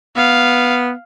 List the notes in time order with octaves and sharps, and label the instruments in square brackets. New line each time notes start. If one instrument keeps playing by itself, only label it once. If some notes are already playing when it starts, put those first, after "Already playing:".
[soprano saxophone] B3 [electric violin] F5